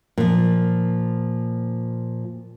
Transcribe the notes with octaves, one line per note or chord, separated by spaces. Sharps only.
A#2 F3